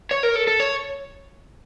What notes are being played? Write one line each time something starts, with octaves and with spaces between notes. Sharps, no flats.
C#5
A#4
A4
A4
C#5